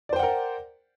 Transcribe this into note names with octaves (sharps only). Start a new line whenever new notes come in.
A#4 C5 D5 F#5 G5